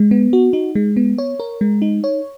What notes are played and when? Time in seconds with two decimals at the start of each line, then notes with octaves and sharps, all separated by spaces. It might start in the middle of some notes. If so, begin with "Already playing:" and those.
Already playing: G#3
0.11 B3
0.33 F#4
0.53 D#4
0.75 G#3
0.96 B3
1.18 C#5
1.40 A#4
1.61 G#3
1.82 D#4
2.04 C#5